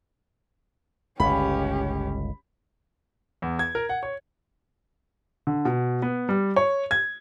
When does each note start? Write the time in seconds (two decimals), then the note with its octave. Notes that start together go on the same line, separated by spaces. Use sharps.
1.20 G1 C#2 C#4 G4 B5
3.42 E2
3.59 G#6
3.75 A#4
3.89 F#5
4.03 C#5
5.47 D3
5.65 B2
6.02 B3
6.29 G3
6.56 C#5
6.91 G#6